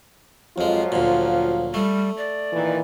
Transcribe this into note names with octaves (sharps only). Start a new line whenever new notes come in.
F2 F3 F#3 G#3 F4
D2 A#2
G3 A3
D5
A#2 D#3 E3